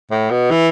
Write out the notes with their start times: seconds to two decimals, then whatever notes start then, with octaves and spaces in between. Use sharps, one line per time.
0.11 A2
0.31 B2
0.51 E3